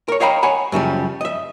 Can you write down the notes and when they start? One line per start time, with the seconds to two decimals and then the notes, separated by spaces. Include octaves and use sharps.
0.08 A#4 C#5
0.20 C#5 D#5 F5 G5 A#5 B5
0.43 C#5 F#5 G#5 B5
0.72 F#2 C#3 F3 G3
1.21 D#5 E5